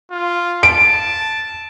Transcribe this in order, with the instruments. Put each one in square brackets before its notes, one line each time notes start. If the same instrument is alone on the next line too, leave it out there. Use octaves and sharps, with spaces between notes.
[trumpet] F4
[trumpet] A5 [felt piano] D7